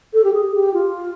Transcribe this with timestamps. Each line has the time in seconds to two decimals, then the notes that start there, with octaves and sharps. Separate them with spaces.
0.14 A4
0.24 G4
0.34 G#4
0.54 G4
0.74 F4